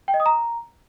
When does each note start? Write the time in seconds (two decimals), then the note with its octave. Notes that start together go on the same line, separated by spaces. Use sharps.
0.08 G5
0.14 D#5
0.20 D#6
0.26 A#5